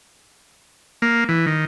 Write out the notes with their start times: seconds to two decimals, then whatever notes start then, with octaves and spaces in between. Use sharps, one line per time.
1.02 A#3
1.29 E3
1.46 D#3